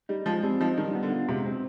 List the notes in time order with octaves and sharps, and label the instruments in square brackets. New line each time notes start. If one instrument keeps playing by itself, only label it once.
[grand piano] G3 [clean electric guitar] D#4
[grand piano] F3 [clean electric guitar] G#3
[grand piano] G3 [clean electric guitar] C4
[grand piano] F3 [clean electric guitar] D#4
[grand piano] D#3 [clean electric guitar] G3
[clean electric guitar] B3
[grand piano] D3
[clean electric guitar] F4
[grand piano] C3 [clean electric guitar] G#3
[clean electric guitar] C4